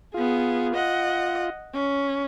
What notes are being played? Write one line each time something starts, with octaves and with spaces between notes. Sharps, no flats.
B3 F4 G#4
D#5 F#5
C#4